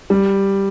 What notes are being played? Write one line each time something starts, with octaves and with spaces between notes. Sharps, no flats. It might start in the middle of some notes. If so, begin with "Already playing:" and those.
G3